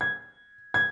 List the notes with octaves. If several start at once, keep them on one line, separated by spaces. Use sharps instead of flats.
G#6
G#6